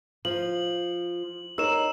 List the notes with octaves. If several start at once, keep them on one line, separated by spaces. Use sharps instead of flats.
F3 F#7
D#4 A#4 C#5 E6 E7